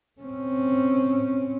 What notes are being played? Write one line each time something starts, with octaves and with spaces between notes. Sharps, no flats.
C4 C#4